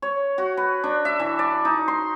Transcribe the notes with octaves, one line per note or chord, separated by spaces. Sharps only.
C#5
F#4
B4
D4
E5
E3
D5
D#4
C6